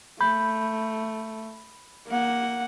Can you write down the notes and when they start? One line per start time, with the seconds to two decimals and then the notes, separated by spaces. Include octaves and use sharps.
0.21 A3 B5 G6
2.07 A#3 F#5